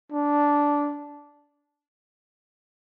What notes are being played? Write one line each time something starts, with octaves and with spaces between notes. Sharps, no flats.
D4